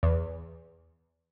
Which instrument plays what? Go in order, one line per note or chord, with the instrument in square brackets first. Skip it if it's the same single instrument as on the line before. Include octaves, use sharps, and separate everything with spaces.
[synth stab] E2